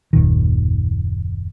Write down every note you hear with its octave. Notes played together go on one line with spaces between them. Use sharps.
F#1 D#2 A#2 D#3